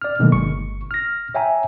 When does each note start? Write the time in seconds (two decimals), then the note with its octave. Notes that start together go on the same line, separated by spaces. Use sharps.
0.02 D5 F6
0.19 B2 D3 D#3 F#3 G#3 A#3
0.32 G1 C#6
0.91 F6 A#6
1.35 C#5 E5 G5 G#5 A#5